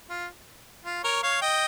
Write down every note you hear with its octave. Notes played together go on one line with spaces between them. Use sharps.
F4
F4
A#4 C#5
C#5 F5
D#5 G5